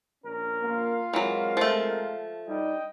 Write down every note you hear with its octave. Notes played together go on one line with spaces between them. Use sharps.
A#1 C#4 A#4
A#3 F4 F5
E3 F#3 G#3 C4 A#4
F3 A3
G2 G3 D#4 D#5 G5